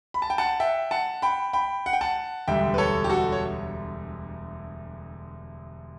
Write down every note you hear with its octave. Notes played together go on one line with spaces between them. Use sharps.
B5
A5
G5
F#5 A5
E5 G5
F#5 A5
G5 B5
G5 B5
F#5
G5
F#5 A5
E1 D2 D3 G3 E5 G5
B4
A4 C#5
G4
F#4 A4
C#5